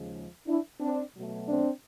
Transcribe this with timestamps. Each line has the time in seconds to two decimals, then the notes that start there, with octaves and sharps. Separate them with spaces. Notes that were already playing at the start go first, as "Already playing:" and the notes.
Already playing: D#2 C#3 F3 G#3
0.47 D4 E4
0.80 C4 D4
1.14 B2 F#3 A3
1.48 C4 D4